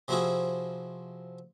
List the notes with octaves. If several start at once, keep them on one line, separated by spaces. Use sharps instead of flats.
C3 F3 C4 E4 F#4 G#4